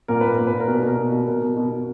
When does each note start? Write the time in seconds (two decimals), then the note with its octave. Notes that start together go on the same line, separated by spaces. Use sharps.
0.08 A#2 A#4
0.21 A#2 B4
0.35 A#2 A#4
0.47 B4
0.53 A#2
0.60 A#4
0.68 B2
0.74 B4
0.83 B2 A#4
0.97 B2
1.12 B2
1.27 B2 A#4
1.42 B2
1.57 B2
1.71 B2